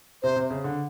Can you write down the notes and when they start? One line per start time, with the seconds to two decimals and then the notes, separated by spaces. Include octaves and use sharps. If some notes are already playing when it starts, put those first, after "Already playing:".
0.23 C3 C5
0.36 C3
0.50 C#3
0.64 D3